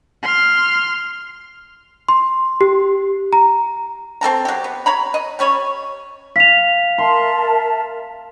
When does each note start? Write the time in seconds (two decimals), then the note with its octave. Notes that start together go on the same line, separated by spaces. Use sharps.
0.23 C6 F6
2.09 C6
2.61 G4
3.33 A#5
4.21 C4 A4 A5 A#5
4.45 F#3 G4
4.64 B3
4.86 C#5 A#5 B5
5.14 D#5
5.39 G3 C#4 C#5 B5
6.36 F5 B6 F7
6.98 A#4 E5 A5 C6